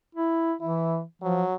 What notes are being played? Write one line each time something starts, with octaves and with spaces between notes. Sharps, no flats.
E4
E3 E4
F3 F#3